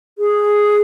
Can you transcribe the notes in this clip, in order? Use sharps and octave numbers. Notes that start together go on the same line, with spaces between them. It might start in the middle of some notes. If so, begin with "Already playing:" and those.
G#4